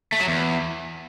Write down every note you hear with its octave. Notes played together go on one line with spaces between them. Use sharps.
A3
F#3
E2